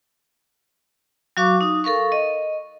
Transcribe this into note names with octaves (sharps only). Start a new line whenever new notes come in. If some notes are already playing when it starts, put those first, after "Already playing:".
F#3 F#4 F5 C#6 D6
D#4 D#6
A4 A#4 F5 C#6
D#5